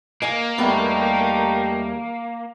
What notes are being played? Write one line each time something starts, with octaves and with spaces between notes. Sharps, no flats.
A#3 D#5 G#5
E2 G3 A3 B3 D#4 G4